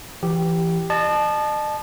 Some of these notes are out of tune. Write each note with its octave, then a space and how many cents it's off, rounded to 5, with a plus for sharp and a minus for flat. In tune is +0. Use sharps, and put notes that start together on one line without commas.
E3 +25 G4 +0
D#5 -40 A5 -15